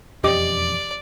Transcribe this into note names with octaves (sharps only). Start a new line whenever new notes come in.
E1 F2 C#4 G4 D5 D#5 D6